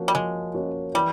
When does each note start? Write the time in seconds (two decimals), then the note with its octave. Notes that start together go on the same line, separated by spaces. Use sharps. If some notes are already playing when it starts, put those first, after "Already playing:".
Already playing: F3 A#3 C#4 F#4
0.08 G3
0.15 F3 G#3
0.54 A#3 C#4 F#4
0.94 E3 G3